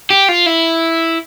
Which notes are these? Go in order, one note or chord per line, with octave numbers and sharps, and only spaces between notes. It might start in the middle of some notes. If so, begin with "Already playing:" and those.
G4
F4
E4